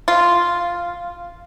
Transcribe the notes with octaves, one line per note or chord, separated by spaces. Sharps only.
F4